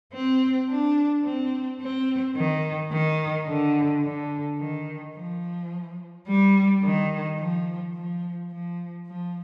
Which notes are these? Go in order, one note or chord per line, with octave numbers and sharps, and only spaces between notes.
C4
D4
C4
C4
D#3
D#3
D3
D3
D#3
F3
G3
D#3
F3
F3
F3
F3